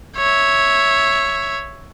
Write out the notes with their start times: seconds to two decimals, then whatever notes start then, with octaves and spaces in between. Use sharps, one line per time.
0.17 C#5 E5